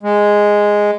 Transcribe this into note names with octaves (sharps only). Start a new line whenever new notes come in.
G#3